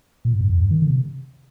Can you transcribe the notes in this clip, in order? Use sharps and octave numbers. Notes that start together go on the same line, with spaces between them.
A#2
G#2
G2
F2
G2
D#3
D3
C3